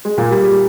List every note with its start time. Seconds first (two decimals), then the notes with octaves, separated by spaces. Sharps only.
0.05 G#3
0.18 A#2 A#3
0.31 G3
0.43 G3